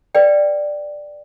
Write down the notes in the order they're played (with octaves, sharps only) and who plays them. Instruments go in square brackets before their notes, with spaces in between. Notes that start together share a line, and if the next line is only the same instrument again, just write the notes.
[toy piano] B4 D5 G5